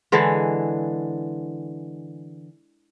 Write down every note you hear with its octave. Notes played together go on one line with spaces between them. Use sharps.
D3 E3 G#3